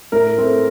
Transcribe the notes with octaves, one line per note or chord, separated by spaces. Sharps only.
A2 A#4
A3 C4